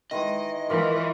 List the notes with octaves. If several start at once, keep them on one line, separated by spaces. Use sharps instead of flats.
D#3 E3 G#3 D#5
E3 C#4 F4 A#4 D5